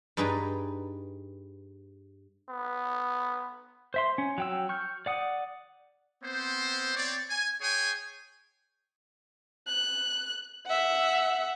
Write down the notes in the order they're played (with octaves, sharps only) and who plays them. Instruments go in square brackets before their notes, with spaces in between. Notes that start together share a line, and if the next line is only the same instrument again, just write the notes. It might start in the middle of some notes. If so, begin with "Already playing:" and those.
[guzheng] G2 D#4 G#4 B4 D5 A#5
[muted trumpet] B3
[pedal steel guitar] C5 E5 C6
C#4
F#3 G5 E6
C#6 F6 G6
D5 F#5 D#6
[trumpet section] B3 C4 C5
C4 C#5 D5
G#5
G#4 C#5 G5 G#5
[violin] F#6
E5 F#5